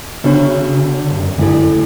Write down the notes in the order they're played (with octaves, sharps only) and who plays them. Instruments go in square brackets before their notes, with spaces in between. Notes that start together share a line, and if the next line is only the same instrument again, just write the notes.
[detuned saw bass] C#3 [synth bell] B3 D4 F#4 C#5
[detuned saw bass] D3
C#3
D3
G2
F#2
[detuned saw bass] G2 [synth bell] D3 A3 E4 A4
[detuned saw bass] A2
F#2